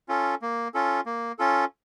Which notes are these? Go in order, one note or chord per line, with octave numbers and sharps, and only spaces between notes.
C#4 F4 A4
A#3
C#4 F4 A4
A#3
C#4 F4 A4